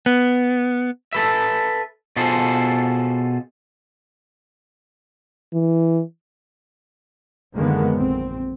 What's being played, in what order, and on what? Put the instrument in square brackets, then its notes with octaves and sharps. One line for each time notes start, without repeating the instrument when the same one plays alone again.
[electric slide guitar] B3
[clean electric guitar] A4 B4 E5
B2 F4 G#4 A4 C5
[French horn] E3
[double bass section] F#2 D3 D#3 G#3 A#3 B3
A#1 C4